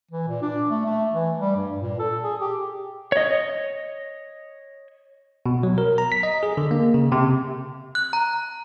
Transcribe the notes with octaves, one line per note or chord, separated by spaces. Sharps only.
E3
A#2
D4
A3
A3
E3
G3
G2
A#2
A4
G#4
G4
C#5 D#5
B2
F#3
A#4
A#5
B6
D#5
G#4
D3
A#3
C#3
C3
F#6
A#5